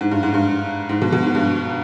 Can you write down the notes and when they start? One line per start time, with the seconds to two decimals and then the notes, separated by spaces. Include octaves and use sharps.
0.01 G#2
0.11 G2
0.23 G#2
0.34 G2
0.89 G#2
1.01 B2
1.12 B2
1.23 G#2
1.35 G2